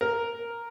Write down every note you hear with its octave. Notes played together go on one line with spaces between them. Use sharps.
A#4